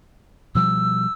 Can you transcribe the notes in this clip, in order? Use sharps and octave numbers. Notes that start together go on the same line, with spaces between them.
B2 F3 G3 E6